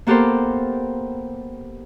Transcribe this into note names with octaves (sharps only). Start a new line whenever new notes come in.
A#3 B3 G4 A4 A#4 C5